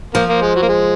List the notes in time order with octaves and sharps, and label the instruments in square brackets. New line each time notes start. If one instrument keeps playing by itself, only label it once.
[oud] F3 [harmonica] A#3
[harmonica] A#3
G#3
F#3
A#3
G#3